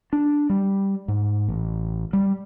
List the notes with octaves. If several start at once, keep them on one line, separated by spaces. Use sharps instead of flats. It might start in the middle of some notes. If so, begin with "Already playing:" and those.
D4
G3
G#2
A1
G3